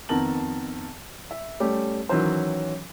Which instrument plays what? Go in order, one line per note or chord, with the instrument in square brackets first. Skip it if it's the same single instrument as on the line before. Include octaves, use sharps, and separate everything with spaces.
[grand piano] F2 D#3 B3 A#4 A5 F#7
E5
G3 A3 C#4 G4
D#3 E3 F#3 C#4 C5